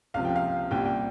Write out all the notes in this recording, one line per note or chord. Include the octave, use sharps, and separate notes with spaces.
C#2 C3 F3 F5
G5
F5
C2 A#2 G3 G5
G5